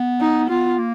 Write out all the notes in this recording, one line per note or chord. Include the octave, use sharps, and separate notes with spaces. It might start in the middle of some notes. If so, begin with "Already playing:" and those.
Already playing: B3
D#4
B3 F4
A#3